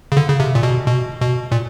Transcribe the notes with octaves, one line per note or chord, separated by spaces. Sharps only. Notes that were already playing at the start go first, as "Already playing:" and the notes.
C#3
D3
C#3
C3
A#2
B2
B2
B2
A#2